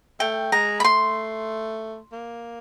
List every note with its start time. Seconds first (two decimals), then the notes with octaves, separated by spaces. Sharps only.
0.20 A3 G5
0.52 G#3 A#5
0.80 B5
0.84 A3 C6
2.12 A#3